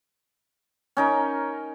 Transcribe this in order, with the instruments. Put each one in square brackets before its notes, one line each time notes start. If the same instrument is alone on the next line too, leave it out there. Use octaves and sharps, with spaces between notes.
[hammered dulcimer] C#4 D#4 A#4